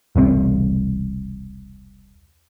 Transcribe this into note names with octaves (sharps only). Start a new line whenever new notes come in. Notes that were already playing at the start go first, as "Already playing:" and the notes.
E1 C2 B2 C4